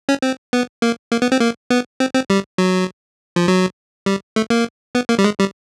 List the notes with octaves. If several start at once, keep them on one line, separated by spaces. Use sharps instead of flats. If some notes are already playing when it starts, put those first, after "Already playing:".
C#4
C4
B3
A#3
A#3
B3
C4
A#3
B3
C4
C4
G3
F#3
F3
F#3
G3
A3
A#3
B3
A#3
G3
G#3
G3